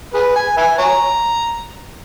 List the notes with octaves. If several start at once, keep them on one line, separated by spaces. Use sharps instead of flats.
G#4 B4
G#5
B4 E5 G#5
C#5 A#5